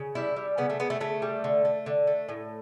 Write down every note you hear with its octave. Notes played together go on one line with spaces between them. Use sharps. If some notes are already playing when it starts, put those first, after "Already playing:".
Already playing: C#3
G3 E4
G3
C#3 B3
A3
C#3 B3
A3
C#3 A3
G3
D3
A3
D3
A3
A2